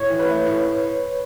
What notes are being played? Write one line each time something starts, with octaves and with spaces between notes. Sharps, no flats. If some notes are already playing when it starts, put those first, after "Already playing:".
Already playing: A2 C#5
E3
B4
A3
A2